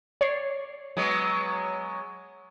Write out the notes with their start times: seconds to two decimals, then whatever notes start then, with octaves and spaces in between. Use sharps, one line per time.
0.21 C#5 D5 C7
0.97 F#3 G#3 B3